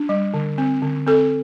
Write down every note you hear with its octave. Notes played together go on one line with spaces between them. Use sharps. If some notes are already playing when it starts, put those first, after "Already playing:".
Already playing: D4
G3
D3
C4
D3
C4 A4